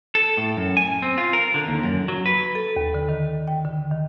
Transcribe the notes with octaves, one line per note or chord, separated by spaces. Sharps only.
A4
A2
F#2
G#5
C4
F4
A#4
D3
D#2
F#2
F#3
B4
A4
D#2
D3
D#3
G5
D3
D#3